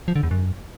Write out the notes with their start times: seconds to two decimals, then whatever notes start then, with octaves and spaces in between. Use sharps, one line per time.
0.08 F3
0.16 D3
0.23 E2
0.31 F#2